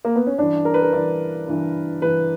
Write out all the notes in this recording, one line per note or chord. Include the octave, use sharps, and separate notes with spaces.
A#3
B3
C#4
G2 E3 D4
A#4
B4
A#4
G2 E3 D5
G2 E3
G2 E3 B4